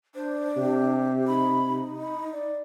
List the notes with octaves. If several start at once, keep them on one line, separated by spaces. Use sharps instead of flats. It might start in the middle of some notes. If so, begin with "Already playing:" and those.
D4 C5
C3 G4
D#4 B5
D#4
B5
D5